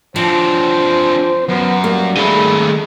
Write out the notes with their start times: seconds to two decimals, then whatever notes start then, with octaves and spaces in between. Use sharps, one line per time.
0.16 F3 C4 D4 C5
1.48 F#2 B3
1.84 G3 A#3
2.17 D#3 G#3 A3 B5